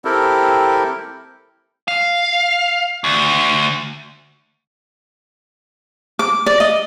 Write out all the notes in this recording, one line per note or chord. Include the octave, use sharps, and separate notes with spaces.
C4 E4 G4 A4 A#4
F5
D2
D6
D5
D#5